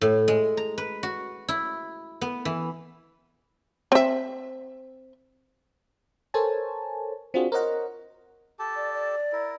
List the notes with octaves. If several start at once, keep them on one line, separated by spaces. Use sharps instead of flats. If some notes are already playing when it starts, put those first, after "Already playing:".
A2
G#3
A#5
B4
F#4
E4
B3
E3
C4 E5
A4 A#4 C5 C#5 G#5 A5
C4 D4 F4 F#4 G#4
A#4 C5 C#5 D#5 F#5 A#5
G4 A4 A5
D5
D5
E4 A#4